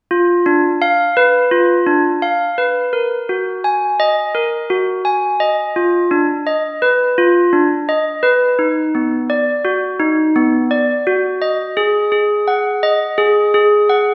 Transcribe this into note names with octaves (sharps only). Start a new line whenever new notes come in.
F4
D4
F5
B4
F4
D4
F5
B4
A#4
F#4
G#5
D#5
A#4
F#4
G#5
D#5
F4
D4
D#5
B4
F4
D4
D#5
B4
D#4
B3
D5
F#4
D#4
B3
D5
F#4
D#5
G#4
G#4
F#5
D#5
G#4
G#4
F#5